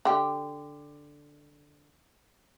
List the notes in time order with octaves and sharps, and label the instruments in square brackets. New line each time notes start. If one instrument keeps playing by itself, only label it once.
[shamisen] D3 G4